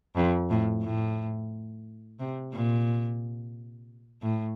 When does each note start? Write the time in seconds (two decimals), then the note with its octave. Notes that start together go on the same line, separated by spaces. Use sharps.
0.16 F2
0.50 A2
0.84 A2
2.20 C3
2.53 A#2
4.22 A2